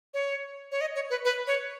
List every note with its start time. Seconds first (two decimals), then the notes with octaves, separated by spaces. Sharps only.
0.14 C#5
0.72 C#5
0.81 D#5
0.95 C#5
1.10 B4
1.25 B4
1.47 C#5